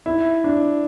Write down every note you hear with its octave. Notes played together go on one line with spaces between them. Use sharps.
E4
D4